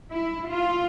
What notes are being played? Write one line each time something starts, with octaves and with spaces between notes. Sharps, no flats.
E4
F4